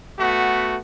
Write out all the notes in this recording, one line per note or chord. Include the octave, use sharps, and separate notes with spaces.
A3 B3 F#4